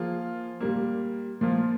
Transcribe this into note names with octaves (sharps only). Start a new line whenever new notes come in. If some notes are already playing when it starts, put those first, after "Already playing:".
Already playing: F3 A#3 F4 G#4
A#2 G3 A#3
A#2 F3 A#3 F4